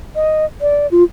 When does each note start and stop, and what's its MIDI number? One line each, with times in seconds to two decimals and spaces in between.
0.16 0.46 75
0.61 0.87 74
0.91 1.03 65